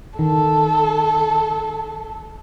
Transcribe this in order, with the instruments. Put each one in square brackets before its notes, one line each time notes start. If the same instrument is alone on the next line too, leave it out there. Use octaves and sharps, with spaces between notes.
[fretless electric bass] D#3 [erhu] A4